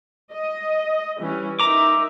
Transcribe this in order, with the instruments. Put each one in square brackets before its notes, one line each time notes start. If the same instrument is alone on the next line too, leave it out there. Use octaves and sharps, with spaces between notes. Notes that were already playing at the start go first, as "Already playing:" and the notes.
[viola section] D#5
E3 G3 C#4
[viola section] D#4 A#4 E5 [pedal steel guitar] A#5 D6